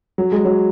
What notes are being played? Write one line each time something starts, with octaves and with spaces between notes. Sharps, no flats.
F#3
G#3
F#3